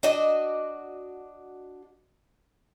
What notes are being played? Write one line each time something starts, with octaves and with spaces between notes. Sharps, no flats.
D4 F#4 D#5